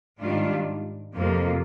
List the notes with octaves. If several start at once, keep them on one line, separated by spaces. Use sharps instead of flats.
G#2 D#3 G3 D4 F4
F2 C3 F3 A#3 F4